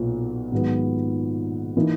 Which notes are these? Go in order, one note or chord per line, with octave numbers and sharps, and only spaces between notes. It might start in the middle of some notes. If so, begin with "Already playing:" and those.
Already playing: B1 A#2 B3
G#2 D#3 F#3 B3
E3 A#3 D#4